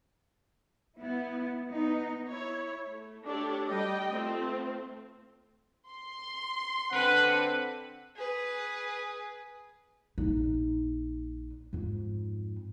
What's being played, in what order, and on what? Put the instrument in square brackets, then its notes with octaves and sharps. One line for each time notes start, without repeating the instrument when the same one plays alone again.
[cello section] B3 E4
B3 D#4
[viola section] E4 C#5
A3
A3 D4 G4 A4 C#5 D5
G3 D#5 G5
A3 C4 F4
[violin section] C6
[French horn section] D3 C4 [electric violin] B4 [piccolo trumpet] F#5
[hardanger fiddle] G#4 B4
[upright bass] A#1 D#4
F2 G#2